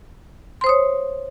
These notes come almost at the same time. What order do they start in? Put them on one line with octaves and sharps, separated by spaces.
C6 C5 D#6 C#5